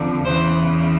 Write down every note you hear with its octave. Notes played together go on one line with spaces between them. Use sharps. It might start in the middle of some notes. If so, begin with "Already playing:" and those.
Already playing: F2 D3
E2 C#3 E3 C5